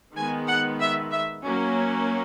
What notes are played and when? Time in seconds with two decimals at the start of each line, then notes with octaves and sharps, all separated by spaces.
0.15 D#3 G#3 B3 G#5
0.47 F#5
0.79 E5
1.12 E5
1.44 F#3 A#3 C#4